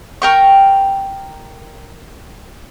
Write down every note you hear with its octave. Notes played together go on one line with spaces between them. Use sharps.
A#4 G5 C#6